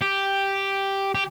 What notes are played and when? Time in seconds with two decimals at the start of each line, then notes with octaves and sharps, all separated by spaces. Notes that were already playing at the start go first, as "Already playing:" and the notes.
0.01 G4
1.15 G4